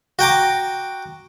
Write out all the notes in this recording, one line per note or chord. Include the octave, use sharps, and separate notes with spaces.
F#4 G5 A#5 D6